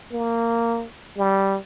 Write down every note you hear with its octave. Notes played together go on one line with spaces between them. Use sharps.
A#3
G3